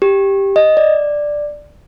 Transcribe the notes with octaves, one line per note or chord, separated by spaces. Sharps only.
G4
D#5
D5